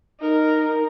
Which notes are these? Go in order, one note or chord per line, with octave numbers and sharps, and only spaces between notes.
D#4 A#4